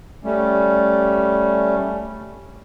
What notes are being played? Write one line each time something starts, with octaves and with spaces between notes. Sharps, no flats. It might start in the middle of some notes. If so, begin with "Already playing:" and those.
G3 A3 C#4